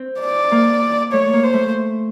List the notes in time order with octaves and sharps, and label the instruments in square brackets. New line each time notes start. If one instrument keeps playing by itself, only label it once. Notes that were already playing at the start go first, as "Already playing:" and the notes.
Already playing: [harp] C4
[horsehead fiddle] D5
[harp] A#3
[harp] A3 [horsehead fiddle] C#5
[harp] A#3
[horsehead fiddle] C5
[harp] A3